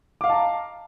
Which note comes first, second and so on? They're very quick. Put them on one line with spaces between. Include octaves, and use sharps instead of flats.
D6 F5 D#5 A5 A#5